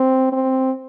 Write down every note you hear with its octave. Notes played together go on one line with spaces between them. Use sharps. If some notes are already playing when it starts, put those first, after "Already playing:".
Already playing: C4
C4